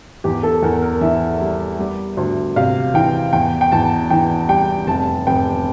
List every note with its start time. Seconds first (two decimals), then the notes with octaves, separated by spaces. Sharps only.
0.24 E2 G4
0.43 A4
0.63 E2 A#4
0.82 A#4
1.01 E3 E5
1.41 G3
1.79 G3
2.17 D2
2.56 C3 F5
2.94 E3 G5
3.33 E2 G5
3.61 G5
3.72 E2 A5
4.10 E3 G5
4.49 G3 G5
4.87 F1 A5
5.27 F1 G5